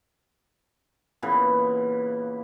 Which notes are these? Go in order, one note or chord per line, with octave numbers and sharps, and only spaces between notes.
A#2 C#3 E3 B3